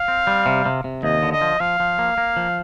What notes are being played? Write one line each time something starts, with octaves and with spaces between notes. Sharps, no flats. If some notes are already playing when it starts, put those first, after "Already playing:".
Already playing: F5
C4
G3
C3
C3
C3
D#2 D#5
D3
D#5
F3
F3 F5
F3
A#3
A#3
F3